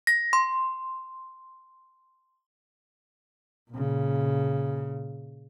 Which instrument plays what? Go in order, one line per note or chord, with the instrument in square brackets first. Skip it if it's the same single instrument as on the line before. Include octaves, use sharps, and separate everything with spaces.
[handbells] A#6
C6
[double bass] A#2 C#3